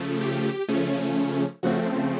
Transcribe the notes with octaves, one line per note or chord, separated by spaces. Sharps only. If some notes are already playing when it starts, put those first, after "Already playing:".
Already playing: C#3 F3 A3
G4
C#3 F3 A3 C#4
C#3 F3 A3 C4 F#4